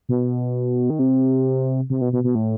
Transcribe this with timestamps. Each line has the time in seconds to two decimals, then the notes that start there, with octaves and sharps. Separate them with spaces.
0.09 B2
0.90 D#3
0.99 C3
1.90 C3
2.01 B2
2.13 B2
2.24 B2
2.35 A2